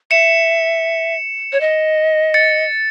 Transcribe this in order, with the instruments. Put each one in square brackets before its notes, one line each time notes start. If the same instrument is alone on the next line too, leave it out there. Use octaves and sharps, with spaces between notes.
[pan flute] E5 [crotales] C#7 E7
[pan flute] C#5
D#5
[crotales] A6 C#7